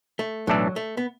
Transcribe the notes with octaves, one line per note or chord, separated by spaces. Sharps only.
A3
B1 A2 E3 F#3 D4 A4
A3
B3